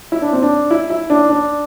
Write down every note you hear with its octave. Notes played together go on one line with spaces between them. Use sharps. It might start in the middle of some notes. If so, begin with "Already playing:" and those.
E4
D4
C4
D4
E4
E4
D4
D4